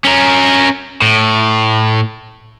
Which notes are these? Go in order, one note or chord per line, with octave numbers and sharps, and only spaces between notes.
C#4 A#4
A2